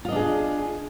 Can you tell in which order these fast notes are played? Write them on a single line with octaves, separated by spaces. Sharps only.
F4 D#5 D4 G#4